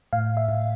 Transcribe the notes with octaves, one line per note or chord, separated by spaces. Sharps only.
A2 F5
E5
A2